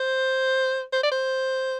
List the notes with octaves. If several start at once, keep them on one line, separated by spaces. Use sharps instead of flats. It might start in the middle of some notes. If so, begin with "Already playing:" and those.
Already playing: C5
C5
D5
C5